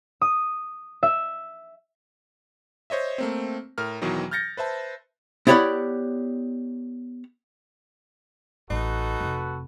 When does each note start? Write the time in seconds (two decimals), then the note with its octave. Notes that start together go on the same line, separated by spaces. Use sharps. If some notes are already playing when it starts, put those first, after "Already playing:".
0.21 D#6
1.03 E5
2.90 C5 C#5 D#5 E5
3.18 A3 A#3 C4
3.78 A2 A#4 F6
4.02 E2 B2 D#3 E3 F#3
4.31 F6 G6 A6 A#6 C#7
4.57 B4 C5 E5 A5
5.47 B3 E4 G4 C#5 D5 F#5
8.70 A1 D#4 F#4 A4 B4
9.21 F1